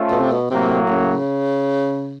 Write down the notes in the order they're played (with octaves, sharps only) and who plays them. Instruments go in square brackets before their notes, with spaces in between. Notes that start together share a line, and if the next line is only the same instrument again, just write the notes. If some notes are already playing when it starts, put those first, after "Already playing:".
Already playing: [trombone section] A3 C#4 F4 A4 C5
[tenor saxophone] B2
C3
B2
[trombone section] A2 F#3 A#3 [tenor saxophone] C3
[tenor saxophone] C#3